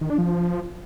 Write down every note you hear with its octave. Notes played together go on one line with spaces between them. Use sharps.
D#3
D4
F3